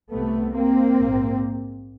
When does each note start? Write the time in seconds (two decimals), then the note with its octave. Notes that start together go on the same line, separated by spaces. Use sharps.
0.11 C2 C3 A3 B3
0.54 A#3 C4
0.97 A#1 G#2